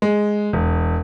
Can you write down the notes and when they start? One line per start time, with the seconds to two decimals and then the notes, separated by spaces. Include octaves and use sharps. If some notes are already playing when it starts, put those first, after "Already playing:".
0.02 G#3
0.53 E1